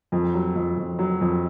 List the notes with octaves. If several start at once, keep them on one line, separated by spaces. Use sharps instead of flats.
F2
F#3
F2
F2
F#3
F2